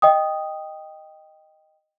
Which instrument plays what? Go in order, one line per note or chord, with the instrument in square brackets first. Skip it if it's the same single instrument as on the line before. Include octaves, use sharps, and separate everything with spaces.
[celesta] D#5 G5 D#6